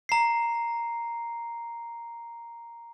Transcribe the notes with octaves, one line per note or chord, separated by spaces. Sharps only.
A#5 C7